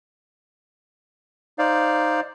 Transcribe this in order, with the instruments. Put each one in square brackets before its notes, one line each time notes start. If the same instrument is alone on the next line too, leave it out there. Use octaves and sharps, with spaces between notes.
[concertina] D#4 C5 D5 F5